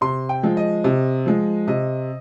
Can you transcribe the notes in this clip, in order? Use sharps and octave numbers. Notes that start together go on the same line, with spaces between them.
C3 C6
G5
F3 G#3
D#5
C3
F3 G#3
C3 D#5